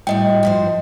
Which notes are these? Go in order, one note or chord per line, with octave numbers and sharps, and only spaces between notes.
A2 G3 F#4 D#5 G5
G2 F3 C5